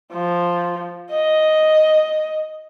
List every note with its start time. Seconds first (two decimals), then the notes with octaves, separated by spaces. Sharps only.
0.13 F3
1.11 D#5